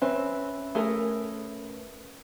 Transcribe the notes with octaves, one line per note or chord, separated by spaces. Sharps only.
C4 C#4 B4 E5
A3 G#4 A#4